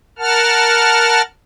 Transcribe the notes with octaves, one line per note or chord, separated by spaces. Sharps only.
A#4 F#5 A5 F6